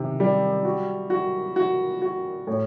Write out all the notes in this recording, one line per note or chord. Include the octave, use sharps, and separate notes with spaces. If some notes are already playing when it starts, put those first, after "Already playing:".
Already playing: C3 D#3
G3
F#4
F#4
F#4
F#4
A2